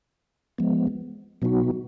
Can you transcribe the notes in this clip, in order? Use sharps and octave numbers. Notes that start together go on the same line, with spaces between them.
F3 G#3 B3
B2 F#3 B3 D#4 F#4